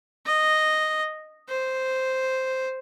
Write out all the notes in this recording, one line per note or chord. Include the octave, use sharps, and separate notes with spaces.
D#5
C5